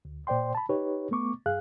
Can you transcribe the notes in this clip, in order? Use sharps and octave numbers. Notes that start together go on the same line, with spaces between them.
D2
A#2 C5 D5 G5 C6
A5 B5
D#4 G4 B4 C#5
A3 B3 C#6 D6
G2 G#4 F5 F#6